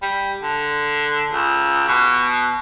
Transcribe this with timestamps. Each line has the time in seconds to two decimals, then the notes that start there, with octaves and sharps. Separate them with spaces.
0.02 G3
0.43 D3
1.31 C#2
1.88 B2